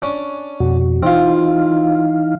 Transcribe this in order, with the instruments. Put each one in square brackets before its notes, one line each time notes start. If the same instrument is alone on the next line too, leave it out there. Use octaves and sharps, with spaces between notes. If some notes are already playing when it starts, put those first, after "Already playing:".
[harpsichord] C#4 D4
[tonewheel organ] F2 B2 F#4
[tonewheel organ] E3 D#4 F5 [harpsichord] C4 F4